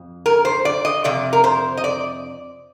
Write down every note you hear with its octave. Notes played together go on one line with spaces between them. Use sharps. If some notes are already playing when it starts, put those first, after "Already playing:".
Already playing: F2
A#4
C5
D5
D#5
F2 C3 D5
A#4
C5
D#5
D5